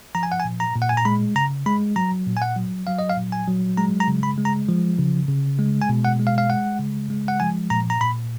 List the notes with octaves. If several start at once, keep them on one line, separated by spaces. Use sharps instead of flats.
F3 A#5
G#5
F#5
G#5
A#2
A#5
A#2
F#5
G#5
A#5
G#3 B5
C#3 A#5
G#3 B5
F#3 A#5
A#2
G#5
F#5
F#3
F#3 F5
D#5
F5
A#2
G#5
F#3
G#3 A#5
A#5
C#3
B5
G#3
A#5
F3
C#3
C#3
G#3
G#5
B2
F#5
G#3
F5
F5
G#3 F#5
C#3
G#3
F#5
F3 G#5
A#2 A#5
A#5
A#2 B5